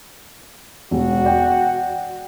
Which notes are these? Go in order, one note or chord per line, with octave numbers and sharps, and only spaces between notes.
E1 F#4
D5 G5